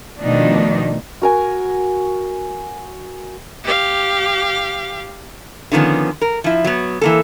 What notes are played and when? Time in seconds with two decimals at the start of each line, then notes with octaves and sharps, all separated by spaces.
0.22 B2 D#3 F3 A3 D4 D#4
1.22 F#4 A#4 G#5
3.64 G4 F5
5.72 D3 D#3 F3 B3 C#4
6.22 A#4
6.44 F3 E4
6.64 F#3 B3
7.01 E3 A#3 A4